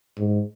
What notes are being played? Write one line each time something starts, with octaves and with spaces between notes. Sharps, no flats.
G#2